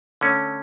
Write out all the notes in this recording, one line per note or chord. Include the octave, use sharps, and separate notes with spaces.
D3 A3 C#4